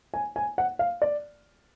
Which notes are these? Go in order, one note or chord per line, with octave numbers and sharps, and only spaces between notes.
G#5
G#5
F#5
F5
D5